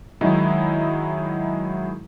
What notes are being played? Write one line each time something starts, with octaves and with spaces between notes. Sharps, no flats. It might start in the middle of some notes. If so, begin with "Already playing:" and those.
D#3 F#3 G#3 D#4 E4